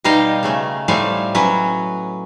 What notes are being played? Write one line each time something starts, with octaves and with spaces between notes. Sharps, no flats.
B2 G3 D#4 D#5 F5 G5
C#3 A3 C#4
A2 G3 A3 C4 F5 G#5
F#3 C#4 F#4 B4